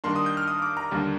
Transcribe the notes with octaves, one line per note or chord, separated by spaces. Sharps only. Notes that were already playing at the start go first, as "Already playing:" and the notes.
G2 D#3 A#3 D4 C6
D#6
G6
F6
D#6
D6
A#5
D#2 D3 G3 A#3 D4